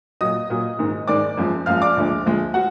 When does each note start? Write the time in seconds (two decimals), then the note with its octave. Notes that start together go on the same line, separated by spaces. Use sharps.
0.21 A#2 F#3 D#5 D#6
0.50 A#2 F#3
0.79 G#2 D#3 G#3
1.07 G#2 D#3 G#3 D5 D6
1.37 F#2 F3 G#3
1.66 F#2 F3 G#3 F5 F6
1.82 D5 D6
1.97 D2 D3 F3 G#3
2.26 D2 D3 F3 G#3
2.54 F#4 F#5